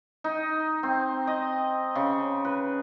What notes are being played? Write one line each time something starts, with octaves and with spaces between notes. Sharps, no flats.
D#4
C4
D#5
C#3
B4